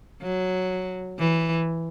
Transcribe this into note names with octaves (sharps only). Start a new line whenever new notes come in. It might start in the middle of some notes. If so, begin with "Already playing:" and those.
F#3
E3